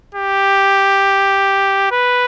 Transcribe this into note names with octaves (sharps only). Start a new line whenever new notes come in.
G4
B4